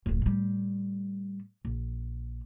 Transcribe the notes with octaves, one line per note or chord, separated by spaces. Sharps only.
D1 F2
A2 G3
A#1